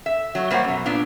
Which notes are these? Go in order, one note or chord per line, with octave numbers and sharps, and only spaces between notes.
E5
F#3 A3
G3 A#3 C5 C#5 F#5
F#2 B2
A#2 B3 D4 F4